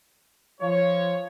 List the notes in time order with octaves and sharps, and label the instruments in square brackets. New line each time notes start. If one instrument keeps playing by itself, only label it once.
[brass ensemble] F3 C#5